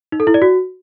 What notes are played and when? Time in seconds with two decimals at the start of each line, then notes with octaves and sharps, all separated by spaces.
0.12 D#4
0.20 A4
0.27 E4
0.34 D5
0.42 F#4